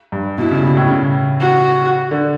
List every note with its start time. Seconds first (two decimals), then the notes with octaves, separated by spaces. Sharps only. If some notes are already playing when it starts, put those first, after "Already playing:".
0.12 G2
0.38 B2 E4
0.51 C#3
0.64 B2
0.77 A2
0.90 C#3
1.41 F#4
2.11 D3